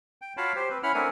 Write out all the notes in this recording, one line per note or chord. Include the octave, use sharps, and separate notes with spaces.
G5
F4 F#4 C#5 F5 A5 B5
G4 C5
C4 B4
C#4 E4 F#5 B5 F6
A3 C4 D4 A#4 F#5 G#5